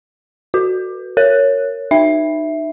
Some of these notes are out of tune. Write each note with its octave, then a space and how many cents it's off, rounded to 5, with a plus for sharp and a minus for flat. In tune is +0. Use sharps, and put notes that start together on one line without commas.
F#4 +0 B4 +0
A#4 -15 C#5 +0
D#4 -25 E5 +0